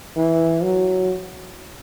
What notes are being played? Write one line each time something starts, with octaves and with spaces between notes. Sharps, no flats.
E3
F#3